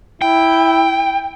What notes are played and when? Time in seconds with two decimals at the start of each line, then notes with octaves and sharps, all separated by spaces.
0.22 E4 G5